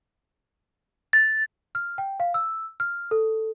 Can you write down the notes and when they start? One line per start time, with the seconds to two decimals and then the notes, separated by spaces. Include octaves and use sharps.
1.13 A6
1.75 F6
1.98 G5
2.20 F5
2.34 E6
2.80 F6
3.11 A4